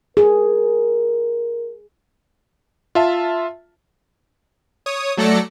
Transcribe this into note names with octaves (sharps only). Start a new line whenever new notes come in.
G#4 A#4
F4 E5 A5
C#5 D#6
F#3 A3 A4 D5 A#6 C#7